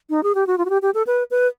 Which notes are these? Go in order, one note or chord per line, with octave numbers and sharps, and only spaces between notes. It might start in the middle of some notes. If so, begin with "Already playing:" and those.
D#4
G#4
G4
F#4
F4
F#4
G4
G4
A4
B4
B4